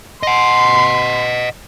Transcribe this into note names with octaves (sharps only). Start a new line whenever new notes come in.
D#5 F#5 C6